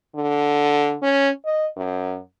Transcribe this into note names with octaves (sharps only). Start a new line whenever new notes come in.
D3
C#4
D#5
F#2